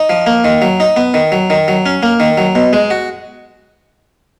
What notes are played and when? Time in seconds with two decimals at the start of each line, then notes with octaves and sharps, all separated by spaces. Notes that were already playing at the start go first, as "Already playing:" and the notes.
Already playing: D#4
0.10 F3
0.26 A#3
0.44 D#3
0.62 F#3
0.80 D#4
0.96 B3
1.14 D#3
1.32 F#3
1.50 D#3
1.68 F#3
1.86 C#4
2.03 A#3
2.20 D#3
2.38 F#3
2.55 B2
2.73 G#3
2.91 F#4